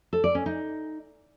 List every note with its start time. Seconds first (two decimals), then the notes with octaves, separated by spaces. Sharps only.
0.13 A4
0.24 D5
0.35 C#4
0.46 D#4